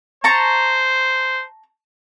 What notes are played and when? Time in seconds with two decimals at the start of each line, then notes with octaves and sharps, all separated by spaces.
0.24 C5 A5 A#5 C#6